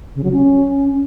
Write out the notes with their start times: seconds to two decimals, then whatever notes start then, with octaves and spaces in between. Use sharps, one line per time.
0.15 C#3
0.24 F#3
0.32 C#4